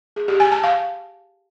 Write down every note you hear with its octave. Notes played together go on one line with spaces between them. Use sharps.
G#4
G4
G#5
A5
F5